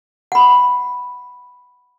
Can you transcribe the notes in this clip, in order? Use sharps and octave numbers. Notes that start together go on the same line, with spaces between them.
F#5 B5